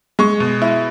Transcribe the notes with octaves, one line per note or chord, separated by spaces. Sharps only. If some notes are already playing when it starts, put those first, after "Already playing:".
G#3 C#6
B2
E4